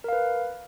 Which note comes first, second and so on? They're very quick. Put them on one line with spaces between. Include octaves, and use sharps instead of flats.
A#4 F5 B4